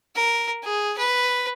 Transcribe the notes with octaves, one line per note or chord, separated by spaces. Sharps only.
A#4
G#4
B4